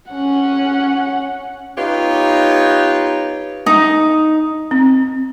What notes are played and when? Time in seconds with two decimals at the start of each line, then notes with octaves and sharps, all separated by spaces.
0.11 C#4 F#5
1.77 B3 D#4 F4 G4 B4 C#5
3.66 D#4
4.71 C4